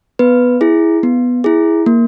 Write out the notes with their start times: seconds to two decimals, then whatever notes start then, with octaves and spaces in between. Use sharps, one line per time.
0.19 B3 B4
0.61 E4 G#4
1.03 B3
1.44 E4 G#4
1.86 A#3